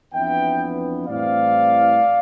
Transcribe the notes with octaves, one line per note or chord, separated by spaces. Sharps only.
F2 E3 B3 D4 E5 G5
A2 E3 G3 C4 D5 F5